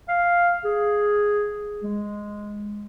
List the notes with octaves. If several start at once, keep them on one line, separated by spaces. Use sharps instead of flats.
F5
G#4
G#3